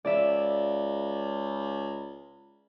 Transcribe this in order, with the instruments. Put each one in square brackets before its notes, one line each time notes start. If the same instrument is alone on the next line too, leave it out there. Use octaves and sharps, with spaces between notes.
[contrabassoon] C#2 [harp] D5 E5